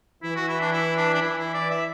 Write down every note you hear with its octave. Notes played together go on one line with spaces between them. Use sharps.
E3 E4
F#4
E4
D4
E4
D4
D4
E3 E4
E4
D5
E5